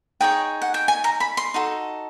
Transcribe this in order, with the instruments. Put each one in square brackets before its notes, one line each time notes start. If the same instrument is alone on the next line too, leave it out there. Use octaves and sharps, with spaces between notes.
[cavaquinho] D#4 G#4 C#5 G5
F#5
G5
G#5
A#5
B5
C6
D#4 F#4 A4